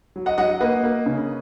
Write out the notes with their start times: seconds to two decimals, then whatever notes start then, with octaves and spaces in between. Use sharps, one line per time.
0.16 F#3
0.26 D#5 F#5
0.38 F#3 D#5 F#5
0.61 A#3 B4 D#5
0.84 A#3
1.06 C#3